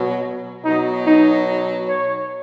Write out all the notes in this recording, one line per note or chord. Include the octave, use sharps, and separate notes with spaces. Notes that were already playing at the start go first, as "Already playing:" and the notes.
Already playing: B2 F#3
B2 F#3 D#4
D#4
C#5